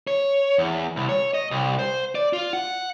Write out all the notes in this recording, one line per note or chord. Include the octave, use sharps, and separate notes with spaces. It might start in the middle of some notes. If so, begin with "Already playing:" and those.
C#5
E2
C2
C#5
D#5
C2
C5
D5
F4
F#5